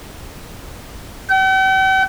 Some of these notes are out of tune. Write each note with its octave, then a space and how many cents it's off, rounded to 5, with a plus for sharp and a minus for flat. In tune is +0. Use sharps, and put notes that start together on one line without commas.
G5 -45